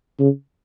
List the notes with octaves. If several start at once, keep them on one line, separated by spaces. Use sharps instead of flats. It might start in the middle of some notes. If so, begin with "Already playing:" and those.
C#3